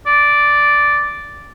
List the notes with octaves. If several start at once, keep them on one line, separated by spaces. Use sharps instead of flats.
D5